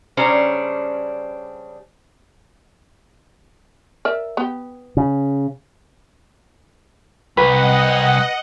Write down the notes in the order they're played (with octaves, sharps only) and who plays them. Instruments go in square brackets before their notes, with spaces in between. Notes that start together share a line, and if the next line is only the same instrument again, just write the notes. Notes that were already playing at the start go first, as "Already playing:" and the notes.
[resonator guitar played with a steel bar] C#3 G3 C#4 D4 C5 A#5
[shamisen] A#4 D5 E5
B3 G4
[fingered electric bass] C#3
[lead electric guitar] C2 [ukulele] B4 [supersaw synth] D#5 F#5